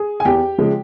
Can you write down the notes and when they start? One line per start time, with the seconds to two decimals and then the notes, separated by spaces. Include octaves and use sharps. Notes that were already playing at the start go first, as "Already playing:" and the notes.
Already playing: G#4
0.20 G#5
0.25 E2 G4 G5
0.58 C#3 F3 G#3